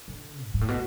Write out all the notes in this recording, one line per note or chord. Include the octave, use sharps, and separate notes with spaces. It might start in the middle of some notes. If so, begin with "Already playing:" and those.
D3
F#2
G#2
A2
B2